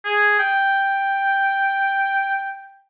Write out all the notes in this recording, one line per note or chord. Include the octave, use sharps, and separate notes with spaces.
G#4
G5